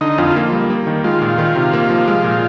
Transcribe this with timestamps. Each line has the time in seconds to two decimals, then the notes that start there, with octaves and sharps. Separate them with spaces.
0.01 D3 D#4
0.18 F2 F4
0.36 A#3
0.52 G3
0.70 A#3
0.87 D#3
1.04 G#3 F4
1.22 A#2
1.38 D#3
1.56 C3
1.73 A#3
1.90 F3
2.07 G#3
2.24 A#2